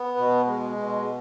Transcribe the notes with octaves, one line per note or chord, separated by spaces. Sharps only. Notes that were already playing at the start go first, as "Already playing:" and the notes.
Already playing: B3
B2
G#3
B2